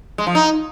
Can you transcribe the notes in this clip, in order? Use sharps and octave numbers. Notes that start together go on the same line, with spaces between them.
G#3
F3
D#4